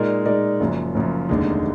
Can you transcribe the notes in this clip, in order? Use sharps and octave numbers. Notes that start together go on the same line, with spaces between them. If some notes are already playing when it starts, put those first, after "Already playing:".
Already playing: A#2 G#3 D#4 A#4 D5
A#2 G#3 D#4 A#4 D5
F#1 F#2 F3
F#1 F#2 F3
F1 D#2 D3 G#3 D#4